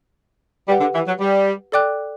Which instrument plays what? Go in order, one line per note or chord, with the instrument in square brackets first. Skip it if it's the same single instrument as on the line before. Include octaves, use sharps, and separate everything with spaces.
[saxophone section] G3 [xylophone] G4 B4 F#5
[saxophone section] D3
E3
F#3
G3
[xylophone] A4 D5 G5 D6 F#6